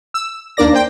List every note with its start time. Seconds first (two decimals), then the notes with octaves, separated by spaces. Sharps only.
0.14 E6
0.57 D#2 A#3 D4 A#4 D5 A#6
0.73 C5 G5